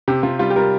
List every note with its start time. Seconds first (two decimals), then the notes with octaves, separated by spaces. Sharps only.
0.08 C3 G4
0.23 C3 F4
0.39 G3 F4
0.50 G4
0.56 G3 A#4